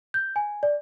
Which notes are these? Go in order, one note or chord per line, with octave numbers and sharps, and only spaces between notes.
G6
G#5
D5